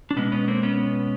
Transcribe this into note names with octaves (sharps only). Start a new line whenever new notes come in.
D4
B2 G#3 B3 C#4
B3 C#4
A#3 C4
B3 C#4